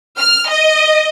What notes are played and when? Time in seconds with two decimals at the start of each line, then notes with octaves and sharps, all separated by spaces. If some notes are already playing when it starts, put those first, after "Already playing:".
0.17 F6
0.49 D#5